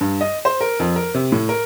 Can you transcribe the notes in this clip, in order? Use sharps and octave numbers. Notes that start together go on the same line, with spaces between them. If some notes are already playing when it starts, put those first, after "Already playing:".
G2
D#5
C5
A#4
F2
A#4
C3
A2
A#4